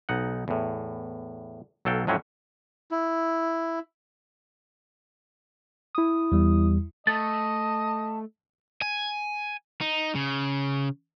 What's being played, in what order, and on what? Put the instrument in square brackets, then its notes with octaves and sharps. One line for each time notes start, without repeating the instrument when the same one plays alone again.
[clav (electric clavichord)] B1 D#4 F#5
E2 A2
B1 F#3 A4 F5 G5
F2 A2 F#3 C4 C#4
[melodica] E4
[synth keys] E4 D#6
[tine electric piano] E2 G3
[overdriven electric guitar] A3 [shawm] D#5 [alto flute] A5 [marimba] A6
[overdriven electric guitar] G#5
D#4
C#3